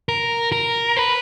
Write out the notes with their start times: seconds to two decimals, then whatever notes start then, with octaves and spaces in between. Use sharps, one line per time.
0.09 A#4
0.52 A#4
0.97 B4